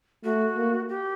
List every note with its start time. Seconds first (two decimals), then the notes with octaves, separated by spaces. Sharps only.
0.24 A3 F#4
0.57 A#3
0.89 G4